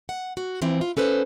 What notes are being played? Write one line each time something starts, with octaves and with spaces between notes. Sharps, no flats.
F#5
F#4
E3 F3 C4 E4
F4
C#4 A4 B4 C5